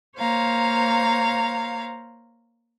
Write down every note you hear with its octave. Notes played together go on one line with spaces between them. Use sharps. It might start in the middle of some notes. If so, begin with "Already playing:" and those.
A#3 C5 C#5 F5 A#5